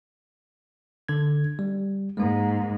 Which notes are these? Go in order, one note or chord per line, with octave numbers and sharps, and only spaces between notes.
D3 G#6
G3
G#2 G#3 A#3